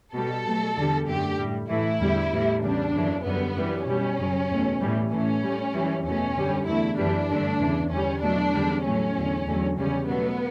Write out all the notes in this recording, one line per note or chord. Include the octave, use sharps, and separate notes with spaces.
B2 G3 A4
B2 F#3 A3
E2 D3 G3
F#2 D3 A3 G4
A2 G3
A2 E3 A3 E4
E2 D3 G3
A2 E3 G3
E2 C#3 G3 D4
F#2 C#3 E3
F#2 D3 G3 B3
F#2 E3 G3
B2 G3 C#4
F#2 C#3 F#3
E2 B2 A3
A2 E3 G3
A2 E3 A3 C#4
A2 G3
F#2 E3 G3
E2 B2 A3 C#4
F#2 D3 G3
E2 D3 A3 E4
F#2 E3 G3 D4
G2 D3 A3
E2 C#3 E3
E2 D3 G3 C#4
E2 B2 F#3 A3 D4
E2 D3 G3
A2 F#3 A3 C#4
E2 D3 F#3
E2 D3 F#3 A3
E2 C#3 G3 C#4
B2 F#3 A3 B3